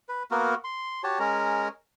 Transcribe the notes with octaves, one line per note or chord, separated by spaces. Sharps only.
B4
A#3 B3 F#4 A#4
C6
F#4 G4 C#5 A5
G#3 C#4 A#4 A#5